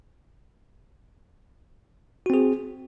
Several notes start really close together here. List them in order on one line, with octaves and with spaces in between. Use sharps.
F#4 C4 G#4